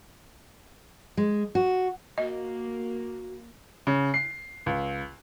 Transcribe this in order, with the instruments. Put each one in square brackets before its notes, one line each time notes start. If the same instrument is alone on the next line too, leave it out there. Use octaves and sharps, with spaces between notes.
[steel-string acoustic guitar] G#3
F#4
[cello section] A#3 [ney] F#4 [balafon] D#5
[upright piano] C#3
C7
C#2